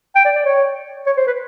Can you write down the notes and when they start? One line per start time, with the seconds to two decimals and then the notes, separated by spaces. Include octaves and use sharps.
0.16 G5
0.25 D5
0.36 D5
0.45 C#5
1.06 C#5
1.17 C5
1.27 B4